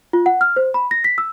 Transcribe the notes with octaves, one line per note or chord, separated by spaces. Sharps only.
F4
F#5
F6
C5
B5
A#6
B6
E6